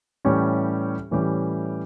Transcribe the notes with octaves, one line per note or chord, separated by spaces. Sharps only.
A2 E3 G3 C#4 G4
A2 E3 G3 C#4 G4